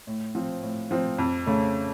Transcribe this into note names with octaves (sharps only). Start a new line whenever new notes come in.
A2
F3 C4
A2
F3 C4
F2
C#3 A3